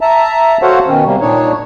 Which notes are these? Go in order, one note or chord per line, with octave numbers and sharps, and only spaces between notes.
E5 A5 A#5
F#4 A4 C5 C#5 F5 F#5
B2 D#3 C#4
C3 G3 A#3
A#2 D4 D#4 C#5